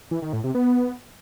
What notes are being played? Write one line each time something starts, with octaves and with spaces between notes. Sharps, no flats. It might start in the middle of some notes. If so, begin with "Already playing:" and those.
E3
D#3
A2
C3
B3